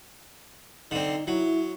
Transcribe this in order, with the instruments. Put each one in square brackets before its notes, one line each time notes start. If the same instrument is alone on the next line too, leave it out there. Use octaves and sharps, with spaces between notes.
[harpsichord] D3 C4 [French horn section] D#4 D5
[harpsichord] F#3 [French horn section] E4